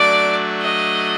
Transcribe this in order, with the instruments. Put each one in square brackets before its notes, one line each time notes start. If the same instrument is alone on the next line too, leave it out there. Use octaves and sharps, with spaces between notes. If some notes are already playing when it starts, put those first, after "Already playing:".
Already playing: [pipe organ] F#3 A3 D4 F#4 [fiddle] D5
[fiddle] D#5